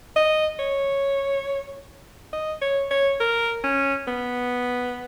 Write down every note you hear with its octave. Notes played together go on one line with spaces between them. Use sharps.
D#5
C#5
D#5
C#5
C#5
A#4
C#4
B3